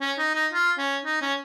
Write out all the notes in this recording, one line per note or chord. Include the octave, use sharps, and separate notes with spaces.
C#4
D#4
D#4
F4
C#4
D#4
C#4